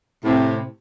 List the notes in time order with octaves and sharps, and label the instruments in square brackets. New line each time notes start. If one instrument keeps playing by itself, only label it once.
[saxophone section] A2 C3